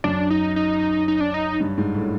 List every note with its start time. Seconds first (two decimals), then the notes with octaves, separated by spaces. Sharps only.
0.04 F#2 D4
0.30 D#4
0.56 D#4
1.08 D#4
1.20 D4
1.34 D#4
1.60 G2
1.78 G#2
1.94 A2